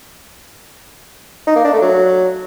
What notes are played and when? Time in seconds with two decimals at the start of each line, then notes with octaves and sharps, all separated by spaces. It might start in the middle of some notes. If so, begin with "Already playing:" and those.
1.47 D#4
1.56 A#3
1.65 D4
1.73 A3
1.82 F#3